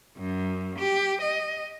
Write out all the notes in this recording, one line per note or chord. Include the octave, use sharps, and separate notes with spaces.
F#2
G4
D#5